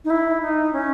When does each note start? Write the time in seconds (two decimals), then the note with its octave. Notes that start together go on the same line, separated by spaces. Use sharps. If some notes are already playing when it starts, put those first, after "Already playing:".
0.05 D#4
0.10 E4
0.42 D#4
0.73 C#4